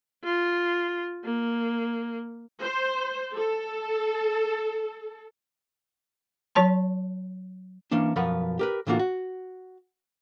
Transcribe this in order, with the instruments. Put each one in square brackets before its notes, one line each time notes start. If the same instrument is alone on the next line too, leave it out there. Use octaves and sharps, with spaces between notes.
[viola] F4
A#3
[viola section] C5
A4
[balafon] F#3 C#5 A5 C6
[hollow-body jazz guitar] E3 A#3 C#4 D4
B1 F#2 F3 A#4 B4 F#5
G4 A#4 B4
A2 D3 E3 A#3 F4 F#4
F#4